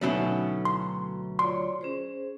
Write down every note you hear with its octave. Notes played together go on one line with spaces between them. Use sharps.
D2 B2 F#3 A3 C#4 D#4 E4
A#5 C6
F4 C#5 D5 C6
C#4 G#4 C5